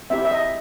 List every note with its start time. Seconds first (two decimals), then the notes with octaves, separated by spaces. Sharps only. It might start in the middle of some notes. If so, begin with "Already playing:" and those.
0.10 C4 E4 G4 E5
0.25 E5
0.31 D#5